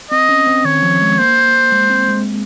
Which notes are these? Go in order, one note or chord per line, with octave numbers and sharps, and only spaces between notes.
C4 D#5
C#4
C4
D#3 C#5
F3
G#3
A#3 C5
G#3
C4
G#3